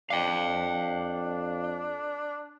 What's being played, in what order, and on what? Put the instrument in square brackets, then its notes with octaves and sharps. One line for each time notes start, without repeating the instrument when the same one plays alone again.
[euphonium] F2 [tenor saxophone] D4 [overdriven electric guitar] F5 G5